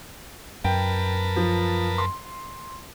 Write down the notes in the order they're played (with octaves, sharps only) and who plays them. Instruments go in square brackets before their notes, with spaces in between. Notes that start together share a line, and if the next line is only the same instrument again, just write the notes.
[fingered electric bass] F#2 [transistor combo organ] A#4 B4 A5 [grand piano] G5
[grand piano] F3
C6